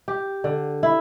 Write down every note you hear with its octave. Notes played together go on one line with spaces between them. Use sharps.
G4
D3
E4